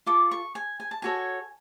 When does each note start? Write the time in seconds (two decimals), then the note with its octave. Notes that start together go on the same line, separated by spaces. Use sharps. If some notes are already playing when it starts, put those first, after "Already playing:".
0.06 F4 A4 D6
0.31 C#6
0.55 G#5
0.80 G#5
0.91 A5
1.02 F#4 A4 C#5 G#5